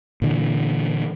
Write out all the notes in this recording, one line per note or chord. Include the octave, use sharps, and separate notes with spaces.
A#2 D3 E3